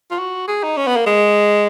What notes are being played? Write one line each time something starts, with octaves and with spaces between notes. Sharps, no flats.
F4
F#4
G#4
D#4
C#4
B3
A#3
G#3